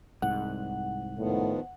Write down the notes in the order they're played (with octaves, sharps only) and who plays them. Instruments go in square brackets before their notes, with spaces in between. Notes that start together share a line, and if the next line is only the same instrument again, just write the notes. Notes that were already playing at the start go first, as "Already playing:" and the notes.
[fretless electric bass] C2 G#2 [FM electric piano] F#5
[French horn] A2 [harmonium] D#3 F3 B3